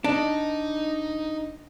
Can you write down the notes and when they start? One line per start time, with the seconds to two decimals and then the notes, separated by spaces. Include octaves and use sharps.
0.04 D4 D#4 D#5